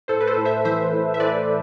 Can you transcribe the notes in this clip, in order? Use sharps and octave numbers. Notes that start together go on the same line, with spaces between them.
A2 A4 C5
B4
A4 C5
A2
C5 E5
E3 C5 E5
A2
E5
E3 B4 D5